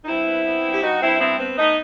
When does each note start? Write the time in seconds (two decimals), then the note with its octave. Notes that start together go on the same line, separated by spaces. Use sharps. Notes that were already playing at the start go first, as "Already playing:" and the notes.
0.04 D#4
0.07 G2 C4 E4
0.27 B3
0.45 B3
0.64 G2
0.73 G4
0.82 G2 D#4 F#4
1.01 G2 C4 E4
1.20 B3 C4 E4
1.39 B3 C4
1.57 A3 B3 D#4